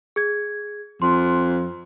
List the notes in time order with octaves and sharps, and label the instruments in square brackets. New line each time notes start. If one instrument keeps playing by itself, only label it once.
[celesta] G#4 G#6
[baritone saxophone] F2 [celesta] C6